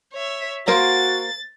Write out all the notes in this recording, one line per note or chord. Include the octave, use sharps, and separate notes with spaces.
C#5 E5
A#3 F#4 A#4 C5 A6